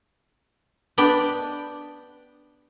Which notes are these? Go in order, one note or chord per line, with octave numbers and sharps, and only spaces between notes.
B3 D4 G5